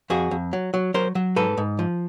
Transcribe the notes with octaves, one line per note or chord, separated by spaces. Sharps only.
F2 F#4 G#4
F2
F#3
F#3
F#3 A#4 C5
F#3
G#2 A4 B4
G#2
F3